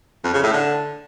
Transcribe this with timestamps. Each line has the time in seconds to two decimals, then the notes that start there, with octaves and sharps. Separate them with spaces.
0.24 F2
0.34 C#3
0.43 A2
0.53 D3